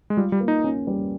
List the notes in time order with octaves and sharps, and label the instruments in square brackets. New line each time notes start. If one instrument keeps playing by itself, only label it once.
[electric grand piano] G#3
[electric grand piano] G3 [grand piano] F4
[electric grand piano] G3
[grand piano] A#3
[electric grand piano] D#4
[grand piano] C#4
G3